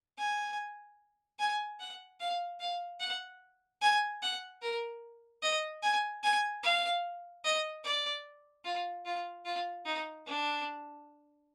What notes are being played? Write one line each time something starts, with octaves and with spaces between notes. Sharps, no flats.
G#5
G#5
F#5
F5
F5
F#5
G#5
F#5
A#4
D#5
G#5
G#5
F5
D#5
D5
F4
F4
F4
D#4
D4